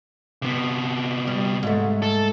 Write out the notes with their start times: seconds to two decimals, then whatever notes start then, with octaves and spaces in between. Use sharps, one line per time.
0.42 C3 B3
1.27 G3
1.63 G#2 A3
2.02 A4